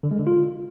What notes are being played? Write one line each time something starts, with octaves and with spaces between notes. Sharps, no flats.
D3
G#3
D3
F4